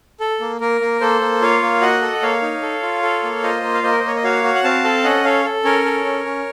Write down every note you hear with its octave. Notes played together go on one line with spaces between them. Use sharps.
A4
A#3
A#3 A#4
A#3
A#3 A4 C5
A#3
F4 C#5 F5
A#3
F#4 D#5 F#5
A4
A#3 C#5 F5
D#4
A4
F4
A4
A#3
F4 C5 D#5
A#3
F5
A#3 C5 D#5
A#4
C5
A#3 C#5
D#5
F#4 C#5 F5
F#4
F#5
C4 F5 A5
A4
C#4 D#5 F#5
A4 C#5 F5
A4
C#4 A#4 C#5
A4
C#4
C#4